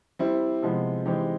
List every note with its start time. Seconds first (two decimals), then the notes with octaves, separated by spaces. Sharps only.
0.19 G3 C4 E4
0.62 C3 F3 G#3 B3
1.05 E3 G#3 C4 D#4 G4